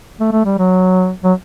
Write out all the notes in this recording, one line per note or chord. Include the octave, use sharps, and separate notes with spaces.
A3
A3
G3
F#3
F#3